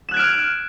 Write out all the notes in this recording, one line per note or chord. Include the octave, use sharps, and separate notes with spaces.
F6 F#6 G#6 D7 E7